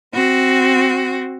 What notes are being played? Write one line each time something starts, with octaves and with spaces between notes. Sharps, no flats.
C4 F#4